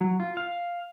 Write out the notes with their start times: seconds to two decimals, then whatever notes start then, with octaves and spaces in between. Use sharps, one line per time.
0.01 F#3
0.20 F4
0.37 F5